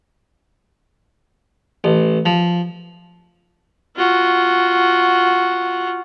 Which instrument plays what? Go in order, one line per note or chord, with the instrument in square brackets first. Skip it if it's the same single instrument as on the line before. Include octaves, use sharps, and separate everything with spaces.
[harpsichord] A1
F3
[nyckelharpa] F4 F#4